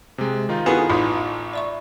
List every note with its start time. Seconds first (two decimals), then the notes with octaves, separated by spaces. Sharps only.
0.18 C3 G#3
0.49 D#3 D#4 F4
0.66 B3 E4 F#4 G#4 A4
0.90 A1 D#4 F4 B5 D#6
1.53 D5 E5 C#6